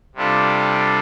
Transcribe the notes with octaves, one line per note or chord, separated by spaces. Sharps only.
C3 G3 D4 F4 A4